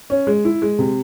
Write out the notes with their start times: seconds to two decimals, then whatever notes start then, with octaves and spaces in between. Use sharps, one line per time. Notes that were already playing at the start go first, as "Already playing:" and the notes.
0.10 C#4
0.27 G#3
0.45 E4
0.62 G#3
0.79 C3